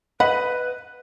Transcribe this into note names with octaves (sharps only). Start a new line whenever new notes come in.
B4 D#5 F#5 B5